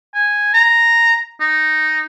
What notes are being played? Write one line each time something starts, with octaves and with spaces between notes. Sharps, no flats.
G#5
A#5
D#4